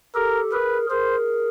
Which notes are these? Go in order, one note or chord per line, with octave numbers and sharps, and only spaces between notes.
G4 A4 A#4
G#4 A#4 B4
G#4 A#4 C5